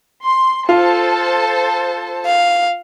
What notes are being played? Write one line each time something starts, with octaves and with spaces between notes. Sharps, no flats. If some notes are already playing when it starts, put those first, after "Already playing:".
C6
F4 A4 C5 A5
F5